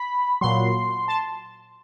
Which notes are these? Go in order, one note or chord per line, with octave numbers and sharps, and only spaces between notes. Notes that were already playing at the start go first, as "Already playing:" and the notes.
Already playing: B5
A#2 F#3 C6
A5